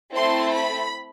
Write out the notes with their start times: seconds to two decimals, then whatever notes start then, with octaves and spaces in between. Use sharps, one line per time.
0.13 A3 C4 E4 A4 C6
0.51 B5